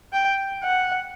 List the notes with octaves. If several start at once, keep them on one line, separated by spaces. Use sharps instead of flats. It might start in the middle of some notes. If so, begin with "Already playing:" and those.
G5
F#5